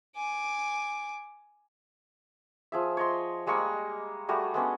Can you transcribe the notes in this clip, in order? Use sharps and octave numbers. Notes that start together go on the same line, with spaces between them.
G#5 D6
F3 G#4 E5
C#5 D#5 C6
G3 G#3 A#3 C#6
G3 A3 F#4 G#4
G#3 B3 C#4 D4